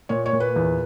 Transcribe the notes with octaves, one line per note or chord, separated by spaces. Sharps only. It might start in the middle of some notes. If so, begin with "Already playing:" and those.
A#2 C#5
C#5
A#2
B4
E2